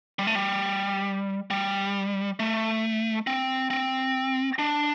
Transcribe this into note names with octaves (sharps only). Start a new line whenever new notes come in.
G3
A3
G3
G3
A3
C4
C4
D4